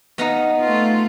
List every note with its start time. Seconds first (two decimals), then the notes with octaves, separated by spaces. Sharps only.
0.18 B3 D#4 D#5 F5 A#5
0.60 A3 F4